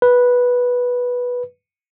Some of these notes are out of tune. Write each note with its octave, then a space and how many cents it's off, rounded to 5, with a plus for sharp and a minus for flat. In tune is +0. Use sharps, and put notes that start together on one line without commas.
B4 -10